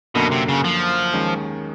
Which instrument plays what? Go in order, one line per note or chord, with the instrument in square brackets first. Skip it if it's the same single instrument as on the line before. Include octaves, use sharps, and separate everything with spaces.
[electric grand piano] F#2 D3 F#3 A#3 [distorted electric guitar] B2
[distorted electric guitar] C3
C#3
F3
[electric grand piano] D#2 D#3 G#3 C#4